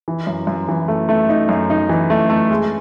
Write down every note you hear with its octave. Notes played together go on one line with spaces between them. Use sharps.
E3
F#2
F#2
E3
A3
A3
D#4
F#2
D#4
E3
A3
A3
G#3